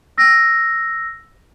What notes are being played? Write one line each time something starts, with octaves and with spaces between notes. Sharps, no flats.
E6 A#6